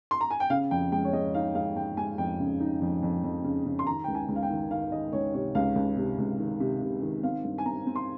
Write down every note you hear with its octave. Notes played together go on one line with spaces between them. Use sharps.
C6
A#5
G#5
G5
C#3 F5
F2 G5
G#3 G5
C#5
G#3 D#5
D#4 F5
G#3 F5
G#3 G5
G#3 G#5
F2 G5
C#3
D#4
F2
F2
F2
C#3
C#3
C6
D#3 A#5
C#2 G5
G#5
C#2
F5
G5
D#3
D#3 F5
D#3 D#5
C#2 C#5
C3 C#5
C#2 F5
C#2
C3
C#2
D#3
C3
C3
D#3
C4 F5
G2
G#5
C4 A#5
C4
C6